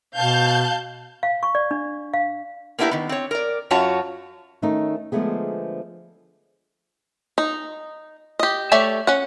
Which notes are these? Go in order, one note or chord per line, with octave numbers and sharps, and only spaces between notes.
B2 F5 A5 G6
F5
C#6
D5
D4
F5
A#3 B3 D4 E4 G4 A#4
D#3 B3
C4 C#5
A#4 D5
F#2 F#3 F4 F#4 C#5 A5
D#3 A3 C#4 D#4
D3 F3 G#3 A3 B3 G#4
D#4
G4 D#5
A3 G4 C#5 D5 E5
C#4 F#5